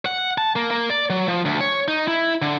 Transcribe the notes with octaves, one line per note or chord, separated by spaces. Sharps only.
F#5
A5
A#3
A#3
D5
F#3
F3
D2
C#5
D#4
E4
D3